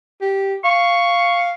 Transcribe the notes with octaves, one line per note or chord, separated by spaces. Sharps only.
G4
F5 C#6